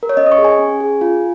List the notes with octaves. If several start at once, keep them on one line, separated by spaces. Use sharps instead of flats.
A#4
C#5
C#4 D#5
D#6
C#6
G#4
G#5
C#4
G#4
F4